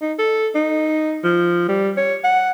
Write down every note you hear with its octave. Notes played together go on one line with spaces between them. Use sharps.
D#4
A4
D#4
F3
G3
C#5
F#5